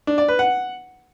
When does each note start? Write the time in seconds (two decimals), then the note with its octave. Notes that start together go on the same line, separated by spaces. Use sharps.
0.07 D4
0.18 D5
0.28 B4
0.39 F#5